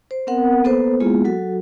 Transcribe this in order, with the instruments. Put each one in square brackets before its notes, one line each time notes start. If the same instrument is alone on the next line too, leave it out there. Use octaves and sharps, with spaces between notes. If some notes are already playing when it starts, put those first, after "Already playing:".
[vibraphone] C5
B3 C4 A#4 F#5
A#3 B3 A4 B4 C5
G#3 A#3 B3 E4 F4 G#4
F#3 F#4 A4